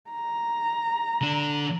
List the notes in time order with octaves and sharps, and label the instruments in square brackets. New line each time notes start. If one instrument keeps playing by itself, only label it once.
[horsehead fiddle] A#5
[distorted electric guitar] D3 D4